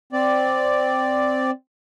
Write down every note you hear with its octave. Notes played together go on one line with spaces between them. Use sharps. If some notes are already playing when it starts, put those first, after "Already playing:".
C4 D5